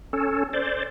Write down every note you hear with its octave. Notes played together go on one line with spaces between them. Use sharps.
C#4 A4
C5 D5